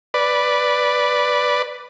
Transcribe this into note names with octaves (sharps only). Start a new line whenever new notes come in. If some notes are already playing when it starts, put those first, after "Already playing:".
B4 D5